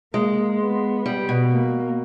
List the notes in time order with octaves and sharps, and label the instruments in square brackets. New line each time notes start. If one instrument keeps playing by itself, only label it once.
[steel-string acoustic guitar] G#3 [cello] A#3
[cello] B3
[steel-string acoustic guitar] G3
B2
[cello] A#3